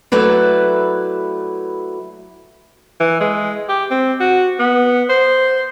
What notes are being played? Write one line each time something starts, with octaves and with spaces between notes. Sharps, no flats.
F#3 A3 E4 B4 D5
E3
G#3
G4
C4
F#4
B3
C5